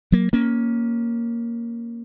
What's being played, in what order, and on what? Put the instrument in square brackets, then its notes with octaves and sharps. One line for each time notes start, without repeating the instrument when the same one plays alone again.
[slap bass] F#3 A#3
A#3 C#4